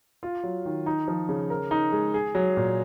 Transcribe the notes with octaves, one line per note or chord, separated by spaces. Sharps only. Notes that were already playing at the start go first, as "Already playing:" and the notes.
F4
F#3
D#3
D#4
F3
C#3
A#4
D#4
G#3
G#4
F#3
A#2